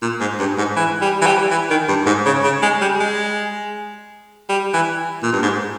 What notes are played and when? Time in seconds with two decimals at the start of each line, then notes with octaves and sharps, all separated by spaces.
0.02 A#2
0.20 G#2
0.39 G2
0.58 G#2
0.76 E3
1.01 G3
1.22 E3
1.26 G3
1.51 E3
1.70 D#3
1.88 G2
2.06 G#2
2.26 C#3
2.44 C#3
2.62 G#3
2.81 G3
3.00 G#3
4.49 G3
4.74 E3
5.23 A#2
5.33 G2
5.43 G#2